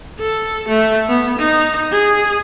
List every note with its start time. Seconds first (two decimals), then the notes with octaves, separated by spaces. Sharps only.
0.19 A4
0.68 A3
1.09 B3
1.39 D#4
1.91 G#4